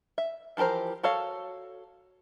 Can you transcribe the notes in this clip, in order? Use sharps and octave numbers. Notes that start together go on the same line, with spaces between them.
E5
E3 F3 G4 A#4 C5
F#4 A4 C#5 F5